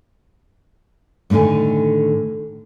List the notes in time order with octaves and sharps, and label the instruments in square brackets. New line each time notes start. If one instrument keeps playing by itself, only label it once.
[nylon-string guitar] F#2 A2 D3 D#3 G#5